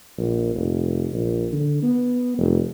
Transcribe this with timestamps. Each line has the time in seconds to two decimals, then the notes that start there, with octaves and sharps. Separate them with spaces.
0.18 A#1
0.56 F1
1.12 A#1
1.52 D3
1.82 B3
2.38 F1